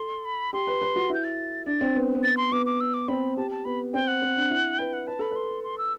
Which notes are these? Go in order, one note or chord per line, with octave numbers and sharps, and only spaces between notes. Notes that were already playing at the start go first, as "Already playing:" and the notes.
Already playing: A4 C6
B5
G4 C6
B4
B4
F#4
E4 G6
A6
D4 A6
C4
B3
B3
A6
C6
B3 D6
D6
E6
D6
C4 B5
G4 A5
A5
B3 B5
C4 G5
F#5
C4
D4
E4
B4 G5
F#5
B4 A5
A4 B5
B4 C6
C6
E6